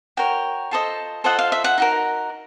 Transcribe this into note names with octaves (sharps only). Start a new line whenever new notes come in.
F#4 A#4 C#5 G5
F4 A4 C5 D#5
F4 A4 C5 D#5 F#5
F5
E5
F#5
D#4 F#4 A#4